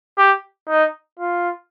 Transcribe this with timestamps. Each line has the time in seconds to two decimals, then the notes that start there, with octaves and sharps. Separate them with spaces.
0.18 G4
0.69 D#4
1.19 F4